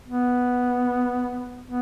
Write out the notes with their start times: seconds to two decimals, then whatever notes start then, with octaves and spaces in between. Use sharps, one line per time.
0.08 B3
1.66 B3